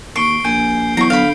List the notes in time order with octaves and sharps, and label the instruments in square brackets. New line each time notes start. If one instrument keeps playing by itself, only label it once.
[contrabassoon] D#2 [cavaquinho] C#6 [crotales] C7 D7 G7
[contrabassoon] A#1 [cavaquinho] G#5 [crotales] G6 D7
[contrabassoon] E3 [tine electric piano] F#3 B3 [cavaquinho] A#5 C#6 [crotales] C7
[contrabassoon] D3 [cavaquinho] F5 B5